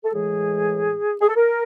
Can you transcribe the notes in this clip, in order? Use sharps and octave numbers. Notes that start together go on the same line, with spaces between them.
A4
A2 E3 G#3 G#4
G#4
A4
A#4